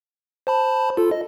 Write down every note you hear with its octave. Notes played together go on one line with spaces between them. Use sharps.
C5 A5 B5
F4 A4
D#5